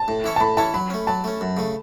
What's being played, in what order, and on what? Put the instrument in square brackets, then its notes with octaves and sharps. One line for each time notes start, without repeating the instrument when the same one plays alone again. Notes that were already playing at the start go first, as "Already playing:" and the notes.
Already playing: [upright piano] A5
[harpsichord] A2
E3 C#4 E4 C#5
[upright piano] A5
[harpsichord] A2 [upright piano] B5
[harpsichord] E3 C#4 E4 C#5 [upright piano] A5
[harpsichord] F#3 [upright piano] B5
[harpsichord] A3 C#4
[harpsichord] F#3 [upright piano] A5
[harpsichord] A3 C#4
F#2
C#3 A3